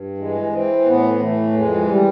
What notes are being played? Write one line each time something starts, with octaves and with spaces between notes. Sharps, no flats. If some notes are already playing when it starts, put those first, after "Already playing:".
Already playing: G2
E3 G#3
E3 C4
A2 B3
E3 A3
F2 G#3
G3